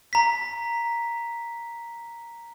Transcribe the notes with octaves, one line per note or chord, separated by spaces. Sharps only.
A#5 B6